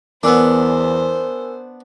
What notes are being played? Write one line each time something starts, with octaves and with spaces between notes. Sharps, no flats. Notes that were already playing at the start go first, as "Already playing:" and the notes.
E2 B3 D4 A#4 C5 G#5 E6